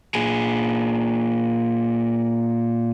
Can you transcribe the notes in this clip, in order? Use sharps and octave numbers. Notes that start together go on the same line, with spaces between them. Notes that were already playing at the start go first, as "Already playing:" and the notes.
A#2 G#4